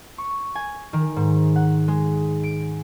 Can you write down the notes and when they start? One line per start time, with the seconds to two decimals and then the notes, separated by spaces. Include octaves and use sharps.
0.18 C#6
0.55 G#5
0.93 D#3
1.16 G#2
1.56 F#5
1.88 G#3
2.43 D7